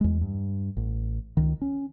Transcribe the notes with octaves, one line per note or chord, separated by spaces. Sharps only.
E2 G#3
G2
A1
C#2 D#3
C#4